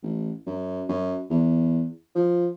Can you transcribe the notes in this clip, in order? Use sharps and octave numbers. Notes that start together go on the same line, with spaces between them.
A1
F#2
F#2
E2
F3